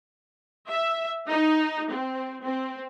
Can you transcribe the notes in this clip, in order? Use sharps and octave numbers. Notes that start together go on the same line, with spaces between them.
E5
D#4
C4
C4